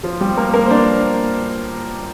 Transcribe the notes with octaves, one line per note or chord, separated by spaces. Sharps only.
F3 F4
G3 G4
A#3 A#4
A#3 A#4
C5
D4 D5